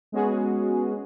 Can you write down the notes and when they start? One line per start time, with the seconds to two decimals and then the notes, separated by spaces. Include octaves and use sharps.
0.12 G#3 B3 C#4 F#4 G#4